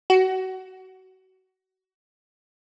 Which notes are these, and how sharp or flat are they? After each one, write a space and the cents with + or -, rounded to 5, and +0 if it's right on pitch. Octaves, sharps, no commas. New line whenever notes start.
F#4 +25